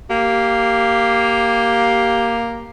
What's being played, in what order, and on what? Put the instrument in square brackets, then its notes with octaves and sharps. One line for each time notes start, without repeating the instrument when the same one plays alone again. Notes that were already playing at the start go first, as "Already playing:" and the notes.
[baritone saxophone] A#3 [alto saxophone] G4